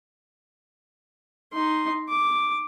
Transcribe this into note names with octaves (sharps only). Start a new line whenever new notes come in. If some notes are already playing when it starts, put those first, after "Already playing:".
D#4 C6
D6